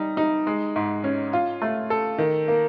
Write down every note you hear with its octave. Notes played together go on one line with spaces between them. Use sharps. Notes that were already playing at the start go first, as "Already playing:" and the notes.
Already playing: G3 D#4
D#4
G#3
G#2
C#4
F4
A3
A4
D#3
A#3